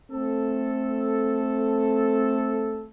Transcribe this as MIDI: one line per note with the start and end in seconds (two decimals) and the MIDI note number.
0.11 2.90 57
0.11 2.90 60
0.11 2.90 69